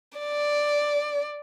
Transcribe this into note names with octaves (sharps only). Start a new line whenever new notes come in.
D5